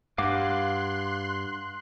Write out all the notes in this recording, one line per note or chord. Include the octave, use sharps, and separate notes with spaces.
G2 F5 F#5 G#5 C6 D6 F#6